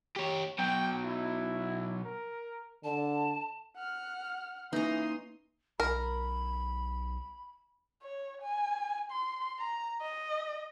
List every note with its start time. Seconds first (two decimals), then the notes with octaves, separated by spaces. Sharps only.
0.16 G4 C#5
0.59 B2 F#3 G5
1.04 E4
2.05 A#4
2.84 D3 A5
3.77 F#5 F6
4.73 E3 A#3 C#4 D#4 A#5 C6 D#6
5.80 B1 A#4 B5
8.03 C#5
8.43 G#5
9.11 C6
9.60 A#5
10.01 D#5